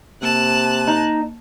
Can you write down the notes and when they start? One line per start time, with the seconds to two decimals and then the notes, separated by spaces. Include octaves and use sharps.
0.23 C3 A#3 A5 F#6
0.88 D#4